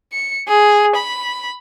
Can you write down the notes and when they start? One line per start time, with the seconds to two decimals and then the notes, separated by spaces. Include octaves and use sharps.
0.12 C#7
0.48 G#4
0.96 B5